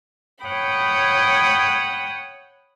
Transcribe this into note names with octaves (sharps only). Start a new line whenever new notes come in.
C#5 F#5 G5 B5 D#6